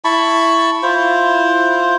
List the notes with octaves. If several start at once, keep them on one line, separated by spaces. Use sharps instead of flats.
E4 A5 B5 C#6
E4 F4 C5